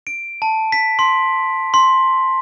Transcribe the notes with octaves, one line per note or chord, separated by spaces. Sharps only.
D7
A5
B6
C6
C6